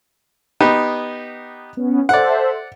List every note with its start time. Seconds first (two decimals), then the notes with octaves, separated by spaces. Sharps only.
0.61 B3 D#4 G4
1.77 B3 C#4
2.09 A4 C5 D5 E5 F#5